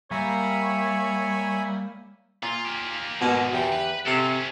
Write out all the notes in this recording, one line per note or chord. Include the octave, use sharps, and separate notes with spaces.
G3 A#3 C#5 E5 G#5 B5
A#2 F4
A#3 G4
G#2 B2 D3 D#3 A#3
E2 G4
B4
C3 C#4 D4 A4 F5 A5